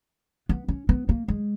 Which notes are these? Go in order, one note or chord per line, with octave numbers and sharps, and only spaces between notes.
B3
C#4
B3
A#3
G#3